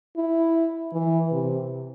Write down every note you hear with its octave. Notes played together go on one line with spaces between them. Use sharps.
E4
E3
C3